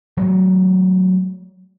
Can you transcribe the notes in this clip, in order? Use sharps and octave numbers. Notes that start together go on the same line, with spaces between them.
F#3 G#3 A3